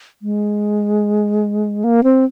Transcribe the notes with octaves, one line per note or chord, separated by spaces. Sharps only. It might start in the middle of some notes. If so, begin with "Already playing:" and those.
G#3
A#3
C4